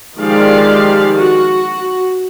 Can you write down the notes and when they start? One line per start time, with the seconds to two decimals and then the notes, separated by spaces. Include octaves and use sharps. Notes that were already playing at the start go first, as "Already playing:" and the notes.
0.19 D#3 F3 G#3 G4 D5 F5
1.16 F#4